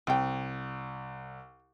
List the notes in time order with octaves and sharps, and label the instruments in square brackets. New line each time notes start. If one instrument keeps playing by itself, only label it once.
[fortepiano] C2 [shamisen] C4 G5